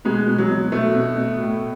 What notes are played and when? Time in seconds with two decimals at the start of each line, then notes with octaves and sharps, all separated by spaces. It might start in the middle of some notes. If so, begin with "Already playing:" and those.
0.05 B2 G#3
0.28 B2
0.38 F#3
0.50 B2
0.72 B2 A3
0.95 B2
1.17 B2
1.40 A2